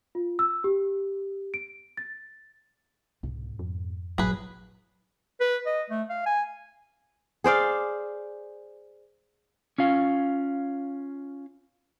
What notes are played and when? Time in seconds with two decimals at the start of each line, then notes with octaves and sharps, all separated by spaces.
0.15 F4
0.39 E6
0.64 G4
1.54 D7
1.97 A6
3.23 C2 G#2 B2
3.59 F2
4.18 A1 G2 A#2 F#3 G#4 B4
5.41 B4
5.66 D#5
5.90 A3
6.10 F5
6.26 G#5
7.44 G#4 C5 D5 F5
9.78 C#4 F4 F5